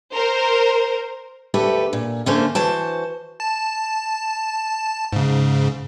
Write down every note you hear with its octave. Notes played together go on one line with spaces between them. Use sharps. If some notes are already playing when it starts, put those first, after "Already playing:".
A#4 C5
D2 A3 G4 A4 B4
A#2
D3 F3 A3 A#3 C#4 C5
E3 F#4 C5 A5
A5
G#2 C#3